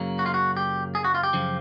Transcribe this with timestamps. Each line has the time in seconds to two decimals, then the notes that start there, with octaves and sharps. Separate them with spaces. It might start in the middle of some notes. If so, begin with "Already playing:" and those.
Already playing: F#2 C#3 F#3 A#3
0.19 F#4
0.26 F4
0.34 F#4
0.57 G4
0.95 G#4
1.05 F#4
1.15 F4
1.23 G4
1.33 F#2 C#3 F3